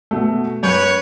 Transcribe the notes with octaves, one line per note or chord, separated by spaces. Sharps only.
B2 A3
F#2 B4 C#5 G6